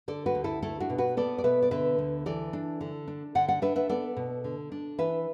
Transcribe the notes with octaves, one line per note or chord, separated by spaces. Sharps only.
D3 A4 D5
F#4 B4
D2
E4 A4
A3 E4 A4
D4 F#4
B2
F#4 B4
B3 A4 D5
D5
B2 B4 E5
D5
D3 B4 E5
D2
E3 A4 D5
D4
D3
D4
D3 D5 F#5
D5 F#5
D4 B4 E5
B4 E5
B3 A4 D5
B2
D3
D4
E3 B4 E5